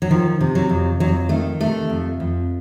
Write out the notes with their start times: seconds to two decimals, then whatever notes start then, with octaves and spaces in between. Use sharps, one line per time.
0.02 F#3
0.10 D#3 F3
0.40 C3
0.55 F#3
0.69 F2
1.00 F2 F#3
1.29 D#3 A3
1.60 C3 A3
1.90 F2
2.20 F2